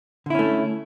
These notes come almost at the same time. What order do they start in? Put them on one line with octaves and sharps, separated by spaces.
D3 E4 C#4 A3